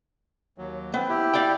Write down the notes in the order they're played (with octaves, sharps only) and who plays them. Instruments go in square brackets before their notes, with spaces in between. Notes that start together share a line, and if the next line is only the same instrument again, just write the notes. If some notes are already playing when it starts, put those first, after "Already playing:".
[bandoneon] D#2 F#3
[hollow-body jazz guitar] B3 [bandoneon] C4
[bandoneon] E4 G4
[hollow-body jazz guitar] D5 F5 G5